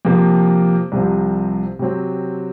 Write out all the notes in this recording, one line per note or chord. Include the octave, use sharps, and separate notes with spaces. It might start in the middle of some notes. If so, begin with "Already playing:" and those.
F2 C3 F3 A#3
C2 C3 F3 C4
C3 F#3 C4